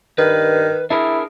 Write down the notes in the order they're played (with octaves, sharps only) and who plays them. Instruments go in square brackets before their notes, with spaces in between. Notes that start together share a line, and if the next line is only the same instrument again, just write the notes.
[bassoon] G2 [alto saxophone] D#3 [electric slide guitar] B4
[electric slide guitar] D4 G#4 A#4 [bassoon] E4